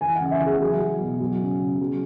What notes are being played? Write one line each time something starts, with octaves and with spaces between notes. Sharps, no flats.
E3 G#5
F#5
C#3
E5
E3 G#4
F#3 G#4
F#3
B2
F#3
C#3
C#3
F#3